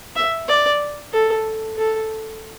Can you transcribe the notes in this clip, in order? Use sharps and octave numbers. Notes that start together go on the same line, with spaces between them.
E5
D5
A4
A4